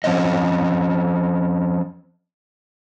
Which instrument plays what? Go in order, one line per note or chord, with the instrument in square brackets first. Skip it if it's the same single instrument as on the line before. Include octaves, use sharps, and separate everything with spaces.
[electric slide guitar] F3 C4 C#4 D#5